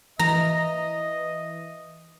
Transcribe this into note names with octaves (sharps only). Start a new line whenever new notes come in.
E3 D#5 A#5